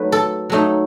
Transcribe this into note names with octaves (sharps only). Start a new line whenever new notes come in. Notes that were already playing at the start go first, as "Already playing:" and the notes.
Already playing: F#3 A3 D#4 B4
A4
F#3 A3 D#4